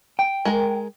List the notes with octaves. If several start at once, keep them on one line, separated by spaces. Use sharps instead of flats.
G5
G#3 A#4